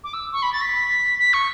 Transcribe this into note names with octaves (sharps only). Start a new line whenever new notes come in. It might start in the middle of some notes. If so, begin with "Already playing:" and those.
D6
E6
C#6
B5
A6
B6
B6
C#6